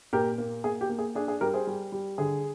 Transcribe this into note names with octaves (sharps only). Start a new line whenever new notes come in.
A#2 G4 A#4
A#3
A#3 G#4
G4
A#3
G#4
D4 G#4
G#4
G3 G4 A#4
G#4 C5
G3
G3
D3 G#4